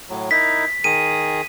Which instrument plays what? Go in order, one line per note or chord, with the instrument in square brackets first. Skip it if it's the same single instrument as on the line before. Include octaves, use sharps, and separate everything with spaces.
[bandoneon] A2 F#3
[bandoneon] D#4 E4 A#4 [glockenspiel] B6
[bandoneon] D#3 G#4 A#4 [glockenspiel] D#7